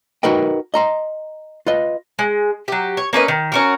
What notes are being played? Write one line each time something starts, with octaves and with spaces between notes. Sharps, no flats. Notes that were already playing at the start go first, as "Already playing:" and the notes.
D#4 F#4 A#4 B4 D#5 G5
D#5 A#5 C6
F4 B4 D#5
G#3
F#3 G4
C#5
A#3 C#4 B4 D#5
D#3
C#4 F#4 A#4